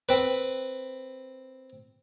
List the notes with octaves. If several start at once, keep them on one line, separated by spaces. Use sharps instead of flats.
C4 B4